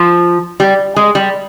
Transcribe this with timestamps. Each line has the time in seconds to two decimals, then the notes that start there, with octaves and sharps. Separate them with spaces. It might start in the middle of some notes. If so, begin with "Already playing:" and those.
Already playing: F3
0.60 G3
0.96 G#3
1.15 G3